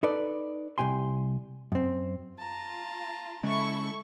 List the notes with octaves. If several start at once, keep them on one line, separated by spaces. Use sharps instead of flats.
D#4 A4 B4 D5
C2 F3 G4 G#5 C6
F#2 C4
F4 A5 A#5
C#3 G#3 E4 A4 C#6